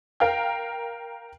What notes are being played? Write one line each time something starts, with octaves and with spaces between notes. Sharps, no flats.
A#4 F5 G5